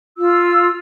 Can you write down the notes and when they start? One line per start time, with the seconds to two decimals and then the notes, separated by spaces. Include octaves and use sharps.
0.18 F4 E6